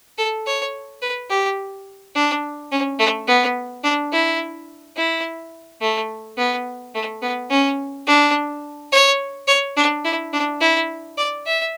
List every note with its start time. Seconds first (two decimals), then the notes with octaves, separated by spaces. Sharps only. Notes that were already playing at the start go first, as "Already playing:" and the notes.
0.18 A4
0.46 C#5
1.02 B4
1.30 G4
2.15 D4
2.72 C#4
2.99 A3
3.27 B3
3.83 D4
4.12 E4
4.96 E4
5.81 A3
6.37 B3
6.95 A3
7.22 B3
7.50 C#4
8.07 D4
8.92 C#5
9.48 C#5
9.77 D4
10.04 E4
10.33 D4
10.60 E4
11.18 D5
11.46 E5